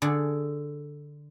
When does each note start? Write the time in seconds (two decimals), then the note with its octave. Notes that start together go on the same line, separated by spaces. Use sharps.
0.02 D3 G#4 A4